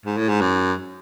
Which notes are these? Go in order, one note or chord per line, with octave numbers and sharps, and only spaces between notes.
G#2
A2
G#2
F#2